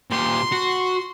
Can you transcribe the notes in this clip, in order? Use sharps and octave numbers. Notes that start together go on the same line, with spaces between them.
A#2 G4 C6
F#4